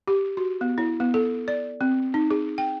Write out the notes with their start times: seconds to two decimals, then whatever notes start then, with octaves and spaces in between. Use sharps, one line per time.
0.08 G4
0.37 F#4
0.61 B3
0.78 E4
1.00 B3
1.14 A4
1.48 D5
1.81 C4
2.14 D#4
2.31 G#4
2.58 G5